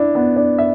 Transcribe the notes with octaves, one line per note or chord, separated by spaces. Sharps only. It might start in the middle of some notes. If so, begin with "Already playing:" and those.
Already playing: D4 E4
B3
D4
E5